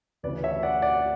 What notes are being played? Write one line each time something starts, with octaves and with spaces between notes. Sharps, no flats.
D2 C#3 E3 B4 D5
C#5 E5
D5 F#5
D5 F#5